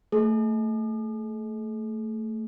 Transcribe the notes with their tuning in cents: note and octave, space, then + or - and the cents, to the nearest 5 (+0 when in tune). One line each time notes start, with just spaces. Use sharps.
A3 +15 G#4 +40